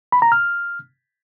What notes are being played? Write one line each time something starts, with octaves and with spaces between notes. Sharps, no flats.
B5
A#5
F6